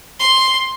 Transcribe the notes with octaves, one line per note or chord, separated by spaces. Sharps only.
C6